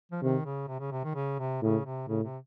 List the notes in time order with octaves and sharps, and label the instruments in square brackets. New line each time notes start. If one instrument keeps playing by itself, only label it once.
[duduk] F3
[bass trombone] C3 [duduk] D#3
[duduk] C#3
C3
C#3
C3
D#3
C#3
C3
[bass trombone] A2 [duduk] C#3
[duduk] C3
[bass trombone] A2 [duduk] C#3
[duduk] C3